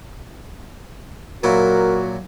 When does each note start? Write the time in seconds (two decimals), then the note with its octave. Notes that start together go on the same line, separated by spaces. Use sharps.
1.44 A#2 F#3 E4 F#4 A#4